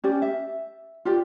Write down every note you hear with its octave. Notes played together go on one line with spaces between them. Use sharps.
C#4 G4 D5
E5
F4 G4 D5